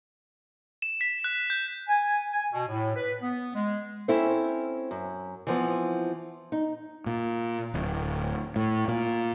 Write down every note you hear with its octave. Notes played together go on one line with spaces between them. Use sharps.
E7
B6
F#6
G6
G#5
G#5
B2
A2
B4
B3
G#3
C4 C#4 E4 A4 C5
F#2
E3 F3 B3 C4
D#4
A#2
D1
A2
A#2